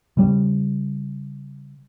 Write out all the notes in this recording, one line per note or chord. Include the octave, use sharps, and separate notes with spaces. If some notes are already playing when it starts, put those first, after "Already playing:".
C#3 G3